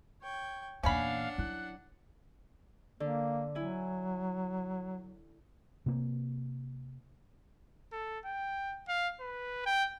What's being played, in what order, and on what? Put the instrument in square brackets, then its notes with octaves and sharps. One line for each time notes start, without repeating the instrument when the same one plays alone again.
[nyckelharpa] C#5 G5
[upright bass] E2 A#2 [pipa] C#4 G#5 B5 [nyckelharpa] D4 F#5 [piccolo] F5
[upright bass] F#3 E4 [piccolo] F#6
[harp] D3 [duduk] A#3
[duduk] F#3 [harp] E4 G#5
[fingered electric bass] C3 A#3
[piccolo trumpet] A4
G5
F5
B4
G5